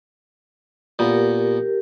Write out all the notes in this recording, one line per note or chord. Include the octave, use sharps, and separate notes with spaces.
A#2 B3 G4 A#4